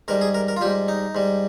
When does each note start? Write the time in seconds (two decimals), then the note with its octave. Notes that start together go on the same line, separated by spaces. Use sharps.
0.08 G#2 G3 A#4
0.21 G#4
0.34 A#4
0.48 A#4
0.57 F4
0.61 G3 G4
0.65 G#2
0.88 D#4
1.15 G#2 G3